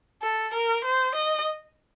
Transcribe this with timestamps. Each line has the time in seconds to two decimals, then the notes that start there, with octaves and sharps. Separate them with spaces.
0.22 A4
0.54 A#4
0.84 C5
1.15 D#5